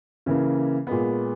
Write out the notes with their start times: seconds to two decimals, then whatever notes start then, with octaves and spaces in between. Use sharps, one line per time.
0.26 C#3 E3 A#3
0.87 A#2 G#3 B3